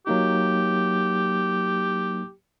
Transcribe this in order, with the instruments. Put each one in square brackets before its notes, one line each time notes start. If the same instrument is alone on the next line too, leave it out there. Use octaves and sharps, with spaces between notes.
[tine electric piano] F#3 A#3 D#4 [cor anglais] G4